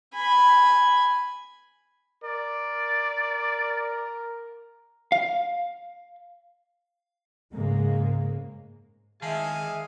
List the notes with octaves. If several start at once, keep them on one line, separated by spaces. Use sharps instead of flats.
G#5 B5
A#4 D5
F5
G#2 C#3 G#3 A#3
D#3 G#3 G#4 E5 F5 G#5 A5